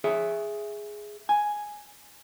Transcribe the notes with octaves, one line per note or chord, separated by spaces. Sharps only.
G#4 C#5 E5
G#5